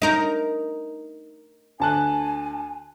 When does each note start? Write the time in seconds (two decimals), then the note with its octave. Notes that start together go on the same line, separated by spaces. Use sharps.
0.02 D#4 A#4
1.80 D2 G#5 A5 F#6